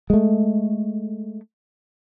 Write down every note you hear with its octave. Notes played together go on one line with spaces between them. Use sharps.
G#3 A3